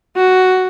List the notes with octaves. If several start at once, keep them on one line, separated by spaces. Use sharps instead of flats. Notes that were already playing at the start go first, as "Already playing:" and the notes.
F#4